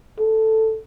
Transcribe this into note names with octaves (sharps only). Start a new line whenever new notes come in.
A4